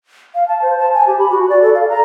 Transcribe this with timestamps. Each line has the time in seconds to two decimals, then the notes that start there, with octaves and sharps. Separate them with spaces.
0.35 F5
0.48 A5
0.62 C5
0.79 A5
0.94 G#5
1.07 G4
1.19 B5
1.30 F#4
1.49 D5
1.62 A4
1.75 F5
1.89 A#5